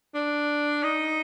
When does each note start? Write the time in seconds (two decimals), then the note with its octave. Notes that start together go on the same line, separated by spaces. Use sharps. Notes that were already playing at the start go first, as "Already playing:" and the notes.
0.15 D4
0.83 D#4